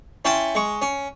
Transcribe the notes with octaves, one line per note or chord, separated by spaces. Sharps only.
C#4 E4 G5 A5 C6
G#3 C#6
C#4